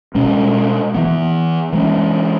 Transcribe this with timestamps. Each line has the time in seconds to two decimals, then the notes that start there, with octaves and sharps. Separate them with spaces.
0.15 B2 G#3 C#4
0.94 E3 B3
1.73 E3 G#3 C#4